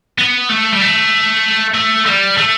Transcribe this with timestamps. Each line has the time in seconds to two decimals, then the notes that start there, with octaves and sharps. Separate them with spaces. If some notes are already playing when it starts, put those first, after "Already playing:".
0.18 B3
0.49 A3
0.72 G3
0.81 A3
1.74 A3
2.06 G3
2.38 A3